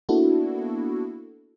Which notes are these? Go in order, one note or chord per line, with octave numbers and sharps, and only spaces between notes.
A#3 B3 D4 E4 F#4 A4